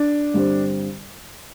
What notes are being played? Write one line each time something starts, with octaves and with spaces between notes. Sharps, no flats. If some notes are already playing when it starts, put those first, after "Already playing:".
Already playing: D4
G2 D3 G3 C4